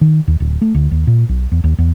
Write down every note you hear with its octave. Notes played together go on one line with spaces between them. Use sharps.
D#3
D#2
D1
A3
D2
D#2
A#2
B1
E2
D#2
E2